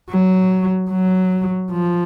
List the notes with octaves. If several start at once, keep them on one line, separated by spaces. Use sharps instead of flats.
F#3
F#3
F3